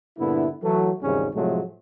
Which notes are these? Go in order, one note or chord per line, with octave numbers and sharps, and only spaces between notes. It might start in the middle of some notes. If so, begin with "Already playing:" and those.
G2 A#2 D3 B3 E4
E3 F#3 A3
G#1 E2 G#2 C#3 G3 C#4
A2 C3 F3 F#3 G#3 A3